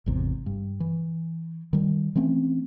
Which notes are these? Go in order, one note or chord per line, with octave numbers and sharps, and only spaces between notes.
G#1 E2 C3
G2
E3
D#3 G3
E3 A3 C4 C#4